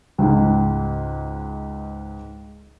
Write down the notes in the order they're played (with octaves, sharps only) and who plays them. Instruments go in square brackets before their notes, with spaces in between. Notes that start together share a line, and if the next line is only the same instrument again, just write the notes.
[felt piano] C#2 G#2